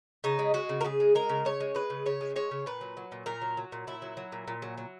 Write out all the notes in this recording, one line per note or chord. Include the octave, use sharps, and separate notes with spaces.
C#3 D#4
G#3
G#3 F#4
C#3
A#4
C#3 G#4
G#3
G#3 A#4
C#3
C#3 C#5
G#3
G#3 B4
C#3
C#3 C#5
G#3
G#3 C#5
C#3
A#2 B4
F#3
F#3
A#2
A#2 A#4
F#3
F#3
A#2
A#2 E4
F#3
F#3
A#2
A#2
F#3
F#3